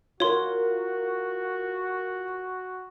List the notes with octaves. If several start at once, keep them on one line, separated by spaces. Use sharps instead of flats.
F4 F#4 A#4 C#5 C6